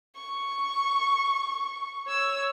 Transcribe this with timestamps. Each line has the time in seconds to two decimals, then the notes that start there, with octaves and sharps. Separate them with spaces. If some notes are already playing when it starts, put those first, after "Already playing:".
0.16 C#6
2.07 C#5 E6